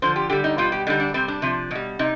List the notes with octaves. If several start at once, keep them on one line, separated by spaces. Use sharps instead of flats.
D3 F3 C5
G4
D3 G3 G4
D#4
B2 G3 F4
G4
D3 G3 D#4
D4
C3 G3 C4
D4
C3 F3
B2 G3
C3 D#4